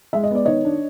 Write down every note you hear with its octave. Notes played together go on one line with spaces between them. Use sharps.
G#3 E5
D#5
B3 D5
D#3 C#5 D#5
D4